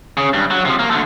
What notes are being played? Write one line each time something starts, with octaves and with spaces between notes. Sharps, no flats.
C#3
G2
F#3
C3 F3
A#3
D3 A3